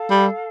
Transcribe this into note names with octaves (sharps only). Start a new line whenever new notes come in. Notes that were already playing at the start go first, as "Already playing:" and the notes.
Already playing: A4 F5 A5
G3